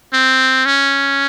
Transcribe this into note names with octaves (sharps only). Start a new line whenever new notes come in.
C4
C#4